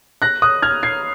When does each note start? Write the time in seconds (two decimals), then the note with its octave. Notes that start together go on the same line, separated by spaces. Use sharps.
0.22 F#6 A#6
0.42 D#6 F#6
0.62 F6 G#6
0.83 G#6 C7